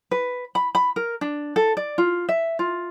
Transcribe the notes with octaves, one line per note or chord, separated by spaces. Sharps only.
B4
B5
B5
A#4
D4
A4
D5
F4
E5
F4